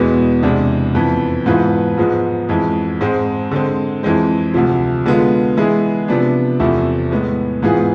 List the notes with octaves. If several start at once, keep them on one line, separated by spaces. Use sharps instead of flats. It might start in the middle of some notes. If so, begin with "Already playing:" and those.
Already playing: E2 B2 G#3 B3
E2 C3 G#3 D4
F2 E3 B3
G#2 E3 B3 F4 B4
G#2 F3 G#3 B3
F2 E3 G#3
G#2 G#3 C4
D3 G#3 C4
F2 E3 G#3 C4
D2 C3 F3
D3 G#3 B3 F4
E3 G#3 B3 E4 G#4
C3 F3 B3 D4
E2 C3 F3 A3 E4
A2 G#3 B3
G#2 E3 B3 F4 G#4